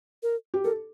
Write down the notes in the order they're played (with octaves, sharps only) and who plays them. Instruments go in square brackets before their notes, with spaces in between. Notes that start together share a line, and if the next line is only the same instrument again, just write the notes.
[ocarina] A#4
[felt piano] G4
[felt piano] A4 [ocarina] A#4